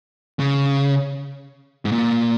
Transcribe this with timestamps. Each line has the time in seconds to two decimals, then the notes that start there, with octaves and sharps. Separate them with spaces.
0.39 C#3
1.85 G#2
1.92 A#2